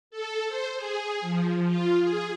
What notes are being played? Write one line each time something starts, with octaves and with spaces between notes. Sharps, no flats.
A4
C5
G#4
F3
F4
G#4